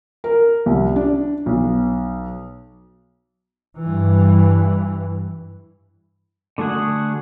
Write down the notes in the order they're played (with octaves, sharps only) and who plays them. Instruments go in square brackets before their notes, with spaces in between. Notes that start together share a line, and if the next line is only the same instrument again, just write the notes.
[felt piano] A#4
C2
D4
B1
[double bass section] G2 E3
[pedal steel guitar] D3 A3 F#4 G#4 F#5